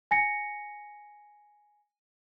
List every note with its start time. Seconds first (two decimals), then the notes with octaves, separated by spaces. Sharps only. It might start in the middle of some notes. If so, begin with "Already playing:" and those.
0.11 G#5 A#6 C#7